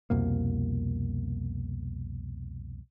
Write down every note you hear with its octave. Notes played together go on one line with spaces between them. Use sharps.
C2 F2 B2 A#3